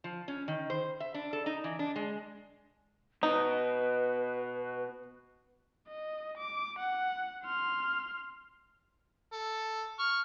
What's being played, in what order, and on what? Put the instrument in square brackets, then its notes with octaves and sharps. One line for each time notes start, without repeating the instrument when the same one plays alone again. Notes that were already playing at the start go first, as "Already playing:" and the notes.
[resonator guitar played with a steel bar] F3
C#4
D#3
C5
E5
D4
A4
D#4
E3
D4
G#3
[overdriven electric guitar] B2 [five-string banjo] D#4 [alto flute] B4
[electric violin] D#5
D6
F#5
C6 F6
[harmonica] A4
C#6 F6